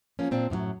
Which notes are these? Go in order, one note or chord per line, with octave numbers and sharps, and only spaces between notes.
F3 A#3 C#4
A#2 C4 D4
F#2 A2 E3 F#3